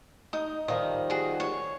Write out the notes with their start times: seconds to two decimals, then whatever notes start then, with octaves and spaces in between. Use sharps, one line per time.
0.33 D#4 D#6
0.68 D#3 F3 G3 D#6
1.10 F#4 G#4
1.40 C#5